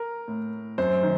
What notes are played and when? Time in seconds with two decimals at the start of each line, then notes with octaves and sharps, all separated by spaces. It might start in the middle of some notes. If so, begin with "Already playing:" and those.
Already playing: A#4
0.28 A2
0.78 F#2 C5
1.03 D#3